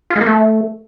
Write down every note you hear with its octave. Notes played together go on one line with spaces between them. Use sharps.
F4
G#3
A#3
A3